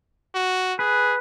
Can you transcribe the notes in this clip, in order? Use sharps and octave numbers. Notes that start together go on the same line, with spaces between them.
F#4
G#4 B4